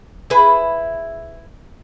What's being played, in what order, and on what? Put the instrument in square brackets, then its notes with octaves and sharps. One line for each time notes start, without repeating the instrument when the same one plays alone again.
[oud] E4 G#4 B4